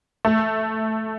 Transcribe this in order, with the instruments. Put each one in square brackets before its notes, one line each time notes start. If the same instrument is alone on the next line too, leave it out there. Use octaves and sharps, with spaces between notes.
[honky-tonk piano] A3